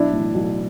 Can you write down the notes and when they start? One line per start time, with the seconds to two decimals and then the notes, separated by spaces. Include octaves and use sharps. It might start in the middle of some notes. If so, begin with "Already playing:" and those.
Already playing: B1 D4 E4
0.13 A2 E3
0.34 B1